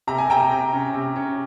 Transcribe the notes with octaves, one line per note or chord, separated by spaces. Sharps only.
C3 A#5
G#5
C3 G5 A#5
C3
C#4
C3
C#4